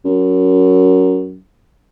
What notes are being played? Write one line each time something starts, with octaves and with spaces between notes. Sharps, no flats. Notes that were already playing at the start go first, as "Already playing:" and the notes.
F#2